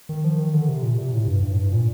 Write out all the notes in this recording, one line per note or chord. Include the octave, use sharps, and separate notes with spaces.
D#3
F3
D#3
D3
C3
A#2
C3
A2
G2
G2
A2
G2
A#2